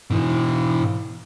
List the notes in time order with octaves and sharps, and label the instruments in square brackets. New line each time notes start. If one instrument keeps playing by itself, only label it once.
[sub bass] G#2 [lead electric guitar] B2 E3